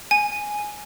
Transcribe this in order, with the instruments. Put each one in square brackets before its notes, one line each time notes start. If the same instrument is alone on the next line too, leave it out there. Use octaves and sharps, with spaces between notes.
[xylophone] G#5